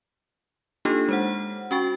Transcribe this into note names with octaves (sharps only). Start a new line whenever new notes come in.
A#3 D4 D#4 F4 G4 A4
G#3 C5 F#5
C#4 F#4 G5 C#6 A6